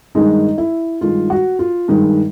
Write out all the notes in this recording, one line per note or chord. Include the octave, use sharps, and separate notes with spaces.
G2 D#3 G#3 D#4
E4
G2 D#3 G#3 F4
F#4
F4
G2 D#3 G#3